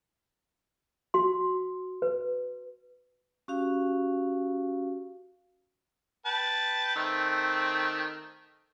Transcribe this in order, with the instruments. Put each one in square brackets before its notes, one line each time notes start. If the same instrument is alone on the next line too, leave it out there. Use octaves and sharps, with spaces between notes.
[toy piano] F#4 C6
B4
[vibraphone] C#4 F#4 G4 F5
[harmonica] B4 G5 A5
D#3 A3 C4